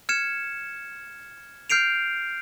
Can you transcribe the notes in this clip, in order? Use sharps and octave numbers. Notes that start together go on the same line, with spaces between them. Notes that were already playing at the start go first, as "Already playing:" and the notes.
F6 G#6 C#7 E7
F6 G6 C7 D7 F7